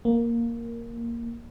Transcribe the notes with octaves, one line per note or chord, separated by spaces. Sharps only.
A#3